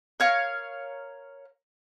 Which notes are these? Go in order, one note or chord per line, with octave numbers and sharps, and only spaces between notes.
A#4 C#5 F5